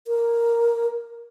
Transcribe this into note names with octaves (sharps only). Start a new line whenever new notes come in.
A#4